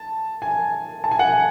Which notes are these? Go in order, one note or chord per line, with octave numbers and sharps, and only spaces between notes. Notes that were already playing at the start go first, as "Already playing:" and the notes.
Already playing: A5
G#5
A5
G#5
F#5
G#5